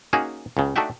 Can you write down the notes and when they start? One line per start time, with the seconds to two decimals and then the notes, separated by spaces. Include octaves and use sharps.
0.13 A#3 C#4 D#4 F#4 G#4
0.57 C#2 C#3
0.76 A3 D4 D#4 F#4 E5 G5